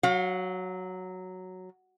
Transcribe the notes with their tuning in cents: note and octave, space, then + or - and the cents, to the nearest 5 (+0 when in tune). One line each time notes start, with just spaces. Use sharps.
F#3 +0 F5 +40